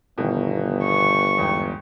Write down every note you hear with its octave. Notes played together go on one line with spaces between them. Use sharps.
G1 B2 D#3 E3
C#6
E2 G#2 G5